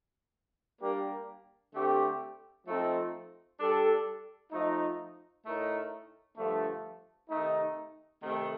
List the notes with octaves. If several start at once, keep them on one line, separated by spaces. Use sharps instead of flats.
G3 A#3 D4 G4 A#4
D3 A3 C4 G4
F3 A3 C4 D#4 A4
G3 D4 A4
F3 A3 D#4
A2 A3 D#4 A#4
G2 D3 F3 A3
C3 D#3 A3 D#4
C3 D#3 A3